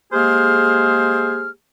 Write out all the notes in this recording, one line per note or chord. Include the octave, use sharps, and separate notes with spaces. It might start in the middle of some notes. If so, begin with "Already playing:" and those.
G#3 A#3 G4 G#4 C5 F6